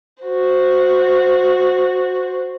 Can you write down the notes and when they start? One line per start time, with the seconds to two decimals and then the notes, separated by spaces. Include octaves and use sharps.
0.24 F#4 C5